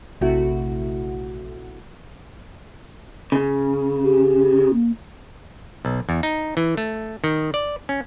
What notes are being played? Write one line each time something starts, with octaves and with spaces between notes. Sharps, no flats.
A#1 C3 A3 E4 F#4
C#3
G4
A#3
B1
E2
D#4
E3
A3
D#3
D5
C#4